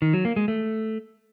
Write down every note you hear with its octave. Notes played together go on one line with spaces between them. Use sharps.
D#3
F#3
A#3
G#3
A3